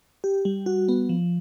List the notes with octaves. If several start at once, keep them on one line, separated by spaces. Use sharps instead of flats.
G4
G3
F#4
B3
F3